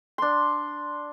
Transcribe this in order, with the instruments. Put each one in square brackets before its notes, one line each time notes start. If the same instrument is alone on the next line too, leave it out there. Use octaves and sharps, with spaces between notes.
[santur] D4 C6